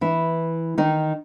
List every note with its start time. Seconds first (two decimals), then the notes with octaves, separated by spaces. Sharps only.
0.01 E3 E4
0.78 D#3 D#4